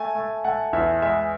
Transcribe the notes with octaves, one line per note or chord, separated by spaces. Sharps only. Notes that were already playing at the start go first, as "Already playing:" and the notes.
Already playing: A3 G#5
A3
A3 F#5
E2 E5
G#3 E5